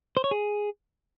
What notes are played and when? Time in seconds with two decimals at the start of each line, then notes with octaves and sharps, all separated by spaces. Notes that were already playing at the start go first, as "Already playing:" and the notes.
0.17 C5
0.24 C#5
0.31 G#4